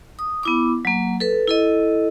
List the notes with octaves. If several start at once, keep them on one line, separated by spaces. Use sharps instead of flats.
D#6
B3 E4 D6
F#3 A#3
A4 B4
E4 A4 D#5